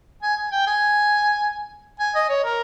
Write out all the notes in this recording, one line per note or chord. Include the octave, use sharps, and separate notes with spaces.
G#5
G#5
G5
G#5
G#5
D#5
C#5
A#4